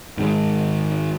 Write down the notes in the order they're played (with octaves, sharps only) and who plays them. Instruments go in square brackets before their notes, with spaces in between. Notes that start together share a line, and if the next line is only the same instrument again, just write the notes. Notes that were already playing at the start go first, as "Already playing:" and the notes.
[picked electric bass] G#2 D#3 G#3